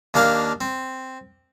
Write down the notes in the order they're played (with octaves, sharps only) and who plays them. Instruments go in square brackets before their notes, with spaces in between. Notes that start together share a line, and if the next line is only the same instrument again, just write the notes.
[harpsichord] D#2 A#3 D4 F5 A5
C4